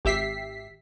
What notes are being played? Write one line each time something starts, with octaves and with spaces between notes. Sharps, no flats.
G#1 G4 E5 B6 C7